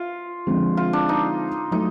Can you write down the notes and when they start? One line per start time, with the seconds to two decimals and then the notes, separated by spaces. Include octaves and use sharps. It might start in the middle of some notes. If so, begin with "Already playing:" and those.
Already playing: F4
0.47 D3 F3 G#3 C4
0.77 F4
0.93 D4
1.09 D#4
1.71 F#3 A3 D#4